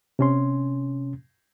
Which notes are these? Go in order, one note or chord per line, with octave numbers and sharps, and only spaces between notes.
C3 C#4 C6